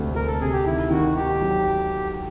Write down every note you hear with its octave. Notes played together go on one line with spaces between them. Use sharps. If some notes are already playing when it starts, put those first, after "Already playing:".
Already playing: D2 C3
D2 A#4
A4
C3 G#4
G4
D#3 E4
D#3 F#4
D#3 G4
F#3